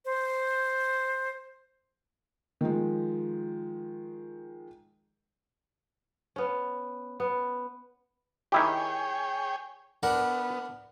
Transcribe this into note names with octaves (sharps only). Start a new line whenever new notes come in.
C5
D#3 F3 G#3
B3 C#4
B3
D#3 E4 G4 G#4 C#5 G5
B3 D4 A#4 F#5